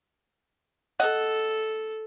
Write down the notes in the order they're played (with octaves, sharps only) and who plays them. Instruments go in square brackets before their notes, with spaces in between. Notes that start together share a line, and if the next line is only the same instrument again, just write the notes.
[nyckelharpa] A4 [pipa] D#5 F#5